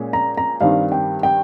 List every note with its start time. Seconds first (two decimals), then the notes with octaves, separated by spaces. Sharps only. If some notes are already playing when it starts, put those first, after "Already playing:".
Already playing: A#2 G#3 C#4
0.13 A#5
0.37 A#5
0.61 G2 D#3 G3 C4 F5
0.92 G5
1.23 G5